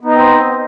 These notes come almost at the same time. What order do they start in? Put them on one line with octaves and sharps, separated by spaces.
B3 D#4 D#5 C4 C5